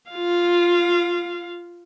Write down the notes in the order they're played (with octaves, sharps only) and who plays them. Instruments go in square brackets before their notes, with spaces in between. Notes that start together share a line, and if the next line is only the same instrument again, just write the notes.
[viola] F4 F5